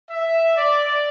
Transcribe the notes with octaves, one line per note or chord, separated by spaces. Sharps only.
E5
D5